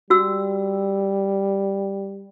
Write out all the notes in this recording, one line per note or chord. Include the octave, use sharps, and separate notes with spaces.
G3 F#4 E6